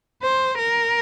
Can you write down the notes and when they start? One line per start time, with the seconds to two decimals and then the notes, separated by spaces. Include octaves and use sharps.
0.23 C5
0.58 A#4